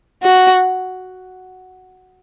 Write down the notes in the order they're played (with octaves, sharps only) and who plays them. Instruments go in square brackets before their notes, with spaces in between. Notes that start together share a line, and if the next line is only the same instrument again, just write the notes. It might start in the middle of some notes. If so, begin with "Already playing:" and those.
[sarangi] F#4